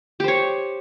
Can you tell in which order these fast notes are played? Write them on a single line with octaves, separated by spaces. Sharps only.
G4 C5 C#5